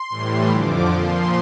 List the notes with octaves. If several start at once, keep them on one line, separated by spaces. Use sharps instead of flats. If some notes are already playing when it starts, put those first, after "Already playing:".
Already playing: C6
A2 E3 G3
F2 D3 F3 D6
A#2 F3 C6